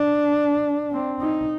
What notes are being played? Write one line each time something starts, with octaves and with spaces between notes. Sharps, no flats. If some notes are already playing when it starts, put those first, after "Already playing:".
Already playing: D4
C4
D#4